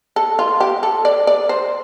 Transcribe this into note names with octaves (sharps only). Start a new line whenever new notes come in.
A4
F4
G4
A4
D5
D5
C5